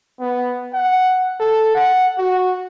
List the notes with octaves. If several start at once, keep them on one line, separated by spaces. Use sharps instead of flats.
B3
F#5
A4
F#5
F#4